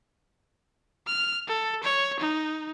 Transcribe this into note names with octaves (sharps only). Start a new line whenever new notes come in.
F6
A4
C#5
D#4